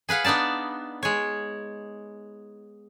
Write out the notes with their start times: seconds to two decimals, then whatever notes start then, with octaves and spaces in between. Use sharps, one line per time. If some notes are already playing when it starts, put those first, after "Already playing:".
0.09 G#4 B4 F5 F#5
0.24 B3 D4 D#4 D5 A5
1.03 G#3 C#5